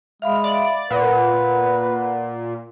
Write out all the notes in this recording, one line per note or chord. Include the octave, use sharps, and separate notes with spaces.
G#3 E5 F5 B5 F6
D5
A#2 B4 F#5